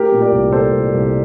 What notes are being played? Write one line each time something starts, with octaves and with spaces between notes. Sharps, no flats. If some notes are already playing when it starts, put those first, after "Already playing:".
Already playing: A3 G4 A#4
A#2
A#4 D5
C2
A#2 A4 C5
C2
C2